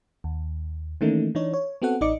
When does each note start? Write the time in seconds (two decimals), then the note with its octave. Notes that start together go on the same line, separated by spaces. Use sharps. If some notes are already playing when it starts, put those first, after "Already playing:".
0.24 D#2
1.01 D#3 E3 A3 A#3 C#4 D#4
1.35 E3 D4 D#4 C#5
1.54 C#5
1.82 B3 C4 F#4 A4 F#5
2.01 A1 D#4 D5 D#5 D6 C#7